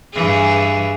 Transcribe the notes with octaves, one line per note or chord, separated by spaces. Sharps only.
G2 E3 G#4